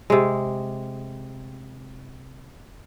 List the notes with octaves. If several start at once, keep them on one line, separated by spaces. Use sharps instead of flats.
C3 G#3